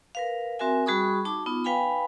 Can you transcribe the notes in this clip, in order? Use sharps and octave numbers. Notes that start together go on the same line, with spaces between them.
A#4 B4 F5
C4 F#4 A#4 E5 G#5
G3 F#4 G#4 B5 C#6 D#6
D#4 A5 D6
B3 D#4 F4
B4 F5 G5 G#5 B5